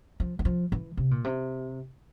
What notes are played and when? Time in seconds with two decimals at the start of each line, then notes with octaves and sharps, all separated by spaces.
0.20 F3
0.39 E3
0.45 F3
0.72 E3
0.97 C3
1.11 A#2
1.24 C3